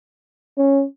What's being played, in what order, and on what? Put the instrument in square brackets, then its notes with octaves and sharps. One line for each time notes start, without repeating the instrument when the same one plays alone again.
[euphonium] C#4